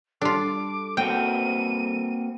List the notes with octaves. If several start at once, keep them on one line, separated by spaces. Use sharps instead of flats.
G3 D4 F4 A4 D6
A#3 C4 F#4 G5 D#7